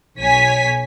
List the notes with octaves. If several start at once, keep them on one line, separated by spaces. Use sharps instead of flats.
B1 C#5 G#5 B6